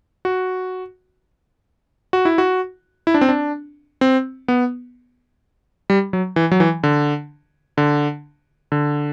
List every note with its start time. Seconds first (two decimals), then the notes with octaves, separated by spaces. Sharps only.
0.25 F#4
2.13 F#4
2.25 E4
2.38 F#4
3.07 E4
3.14 D4
3.21 C4
3.29 D4
4.01 C4
4.48 B3
5.90 G3
6.13 F#3
6.36 E3
6.51 F#3
6.60 E3
6.83 D3
7.78 D3
8.72 D3